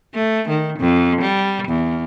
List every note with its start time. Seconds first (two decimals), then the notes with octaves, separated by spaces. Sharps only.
0.14 A3
0.49 D#3
0.79 F2
1.22 G3
1.68 E2